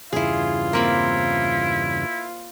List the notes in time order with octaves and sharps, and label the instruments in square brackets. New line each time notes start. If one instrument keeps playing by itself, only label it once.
[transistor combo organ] E2 G2 C#3 [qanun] E4 G#4 [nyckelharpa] F4
[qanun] A#3 C4 B5 [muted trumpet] E4